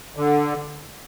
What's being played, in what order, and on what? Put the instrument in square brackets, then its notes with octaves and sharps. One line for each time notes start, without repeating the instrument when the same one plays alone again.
[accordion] D3